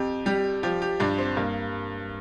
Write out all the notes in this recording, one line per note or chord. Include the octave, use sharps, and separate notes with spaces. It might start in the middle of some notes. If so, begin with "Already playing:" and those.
Already playing: F2 G4
G3 G4
F3 G4
G4
G2 D4
C4
G2 A#3